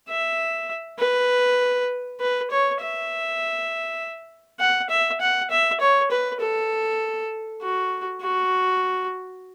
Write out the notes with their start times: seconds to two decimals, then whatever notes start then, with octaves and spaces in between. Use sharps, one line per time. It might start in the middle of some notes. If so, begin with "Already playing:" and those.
0.09 E5
0.99 B4
2.20 B4
2.51 C#5
2.80 E5
4.60 F#5
4.90 E5
5.21 F#5
5.51 E5
5.81 C#5
6.11 B4
6.41 A4
7.62 F#4
8.22 F#4